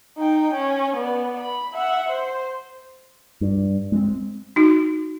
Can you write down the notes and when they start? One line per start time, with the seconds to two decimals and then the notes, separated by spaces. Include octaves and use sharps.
0.17 D#4 G5
0.53 C#4
0.96 B3 D5
1.39 B5
1.74 E5 F#5
2.09 C5
3.41 G2
3.92 G#3 C4
4.56 D#4 F#4